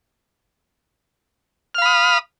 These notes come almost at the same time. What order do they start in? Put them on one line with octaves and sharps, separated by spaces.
F6 F5 B5 D#6